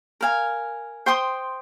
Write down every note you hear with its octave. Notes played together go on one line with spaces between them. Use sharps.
A#4 F5 G#5
C5 G5 C6 D#6